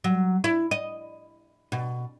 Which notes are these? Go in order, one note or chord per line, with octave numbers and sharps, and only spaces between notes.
F#3
E4
D#5
B2